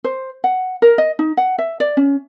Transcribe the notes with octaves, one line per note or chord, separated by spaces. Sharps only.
C5
F#5
A#4
D#5
D#4
F#5
E5
D5
C#4